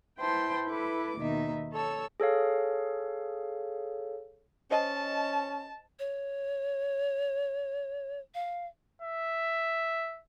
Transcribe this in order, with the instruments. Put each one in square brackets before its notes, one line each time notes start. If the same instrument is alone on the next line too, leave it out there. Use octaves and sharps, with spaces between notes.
[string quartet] E4 B4 C5 G5 A5 C6
E4 A4 B4 D6
D#2 B2 D#3 D#4 E5
A4 C#5 A5 E6
[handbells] G#4 A4 C#5 F5
[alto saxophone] C#4 [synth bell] C5 D#5 [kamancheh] A5
[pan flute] C#5
F5
[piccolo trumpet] E5